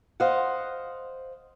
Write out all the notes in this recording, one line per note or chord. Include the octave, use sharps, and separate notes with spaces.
C5 D#5 F5 F#5